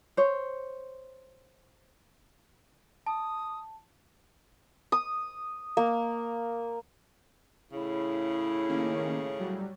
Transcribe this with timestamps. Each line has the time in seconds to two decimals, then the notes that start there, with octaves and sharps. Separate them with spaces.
0.17 C5 C#5
3.06 A5 D#6
4.92 D#6
5.77 A#3
7.72 A2 C#3 E4
8.69 D#3 A#3 C#4
9.39 F#3 G3